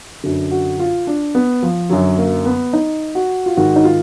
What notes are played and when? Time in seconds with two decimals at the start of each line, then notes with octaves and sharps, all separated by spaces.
0.24 F#2 D3
0.51 F#4
0.79 F4
1.07 D4
1.35 B3
1.63 F3
1.90 F#2 D3 F#3
2.18 A#3
2.46 B3
2.73 D#4
3.15 F#4
3.46 F4
3.57 G#2 D#3 F#4
3.76 D#4
3.84 F4